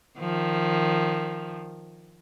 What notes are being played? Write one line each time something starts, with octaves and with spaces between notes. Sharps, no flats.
D#3 F3